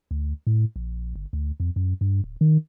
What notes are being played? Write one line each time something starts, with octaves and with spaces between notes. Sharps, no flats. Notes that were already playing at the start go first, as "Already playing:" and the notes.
D2
A2
A#1
G1
D2
F2
F#2
G2
D1
D#3